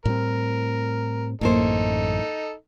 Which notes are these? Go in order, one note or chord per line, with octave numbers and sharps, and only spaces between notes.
A2 G3 C4 A#4
A1 F#2 A2 A#3 D#4 A4 C5